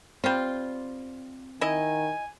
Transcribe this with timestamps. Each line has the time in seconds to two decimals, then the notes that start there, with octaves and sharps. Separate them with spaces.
0.24 G3 C4 F4
1.61 D#3 E4 D#5 G#5